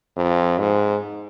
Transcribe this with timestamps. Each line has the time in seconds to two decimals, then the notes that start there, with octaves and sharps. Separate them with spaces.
0.17 F2
0.59 G#2